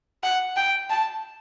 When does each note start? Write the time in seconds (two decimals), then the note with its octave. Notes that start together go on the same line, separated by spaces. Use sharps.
0.23 F#5
0.56 G5
0.90 A5